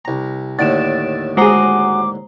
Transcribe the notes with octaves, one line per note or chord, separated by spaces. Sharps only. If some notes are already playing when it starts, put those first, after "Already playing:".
C2 A#5
D#2 A2 D3 A6 D7 E7
G#3 F#4 G#4 C5 A#5 D6